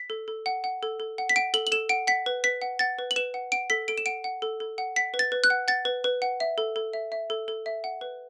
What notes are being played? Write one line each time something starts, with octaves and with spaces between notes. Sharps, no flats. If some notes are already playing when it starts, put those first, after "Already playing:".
Already playing: B6
A4
A4
F#5
F#5
A4
A4
F#5
B6
F#5 D7
A4 F#7
F#7
A4 E7
F#5 D7
F#5 B6
B4
B4 B6
F#5
F#5 A6
B4
F#7
B4 E7
F#5
F#5 D7
A4 B6
A4 D7
E7
F#5 D7
F#5
A4
A4
F#5
F#5 B6
B4
A6
B4
F#6
F#5
F#5 A6
B4
B4
F#5
E5
A4
A4
E5
E5
A4
A4
E5
F#5
B4